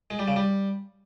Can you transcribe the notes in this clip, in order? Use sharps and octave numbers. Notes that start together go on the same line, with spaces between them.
G#3
G3
C#3
G3